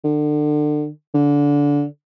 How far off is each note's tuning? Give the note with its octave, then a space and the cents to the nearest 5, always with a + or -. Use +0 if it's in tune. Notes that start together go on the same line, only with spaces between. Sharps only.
D3 +30
D3 -20